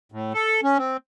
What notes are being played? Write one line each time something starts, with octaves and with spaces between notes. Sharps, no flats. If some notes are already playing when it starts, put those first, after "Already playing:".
A2
A4
C#4
C4